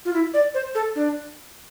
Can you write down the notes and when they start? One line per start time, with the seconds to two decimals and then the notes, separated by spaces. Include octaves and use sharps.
0.05 F4
0.13 E4
0.34 D5
0.54 C5
0.75 A4
0.96 D4